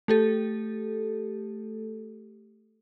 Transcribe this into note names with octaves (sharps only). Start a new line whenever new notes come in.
A3 G4 A4